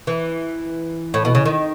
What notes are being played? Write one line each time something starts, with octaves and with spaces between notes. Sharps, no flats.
E3
A2
B2
C#3
D#3